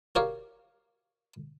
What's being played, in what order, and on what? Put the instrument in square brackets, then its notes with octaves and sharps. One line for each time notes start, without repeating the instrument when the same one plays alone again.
[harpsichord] F#4 G4 A#4 C#5 D5 F5